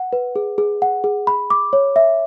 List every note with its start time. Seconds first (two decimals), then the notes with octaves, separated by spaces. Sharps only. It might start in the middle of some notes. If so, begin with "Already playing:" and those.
Already playing: F#5
0.13 B4
0.36 G#4
0.58 G#4
0.82 F#5
1.04 G#4
1.27 B5
1.50 D6
1.73 C#5
1.96 E5